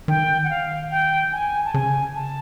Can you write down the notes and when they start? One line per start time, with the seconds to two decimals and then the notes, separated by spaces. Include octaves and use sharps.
0.08 D#3 G5
0.44 F#5
0.50 F5
0.91 G5
1.32 G#5
1.65 A5
1.74 C#3 G#5
2.15 A5